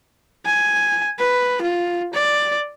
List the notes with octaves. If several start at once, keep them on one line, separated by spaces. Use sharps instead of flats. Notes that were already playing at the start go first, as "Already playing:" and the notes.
G#5
B4
F4
D5